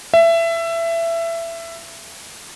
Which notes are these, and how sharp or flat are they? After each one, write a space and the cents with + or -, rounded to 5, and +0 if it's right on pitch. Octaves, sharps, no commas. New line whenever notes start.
E5 +20